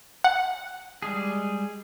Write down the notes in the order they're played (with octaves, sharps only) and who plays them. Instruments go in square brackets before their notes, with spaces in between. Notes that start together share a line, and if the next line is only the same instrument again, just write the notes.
[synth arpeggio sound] F#5
[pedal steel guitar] G3 G#3 G#4